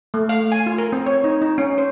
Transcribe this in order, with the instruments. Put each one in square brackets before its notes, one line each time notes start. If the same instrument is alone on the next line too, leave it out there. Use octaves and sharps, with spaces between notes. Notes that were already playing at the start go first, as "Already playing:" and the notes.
[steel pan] A3
F5
G#5
F4
A#4
C4
C#5
D#4
D#4
C#4
C5